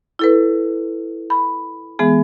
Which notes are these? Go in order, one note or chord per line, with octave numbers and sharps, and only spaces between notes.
E4 A4 B4
B5
E3 G#3 B3 G#4